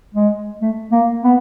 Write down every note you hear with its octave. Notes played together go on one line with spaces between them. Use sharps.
G#3
A3
A#3
B3